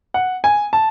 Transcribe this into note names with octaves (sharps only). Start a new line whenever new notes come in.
F#5
G#5
A5